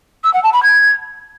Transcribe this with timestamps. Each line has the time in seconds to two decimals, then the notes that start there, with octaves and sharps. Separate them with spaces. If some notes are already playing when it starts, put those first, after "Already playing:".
0.24 E6
0.33 F#5
0.43 A5
0.53 B5
0.63 G#6